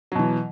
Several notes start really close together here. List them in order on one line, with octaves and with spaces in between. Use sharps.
F#3 B2 E3